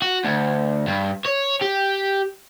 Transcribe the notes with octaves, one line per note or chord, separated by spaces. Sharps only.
F#4
D2
G2
C#5
G4